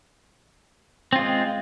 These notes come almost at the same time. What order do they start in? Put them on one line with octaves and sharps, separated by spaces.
C4 F4 G#3